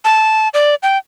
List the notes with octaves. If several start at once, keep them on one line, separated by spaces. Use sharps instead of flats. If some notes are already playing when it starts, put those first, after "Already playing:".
A5
D5
G5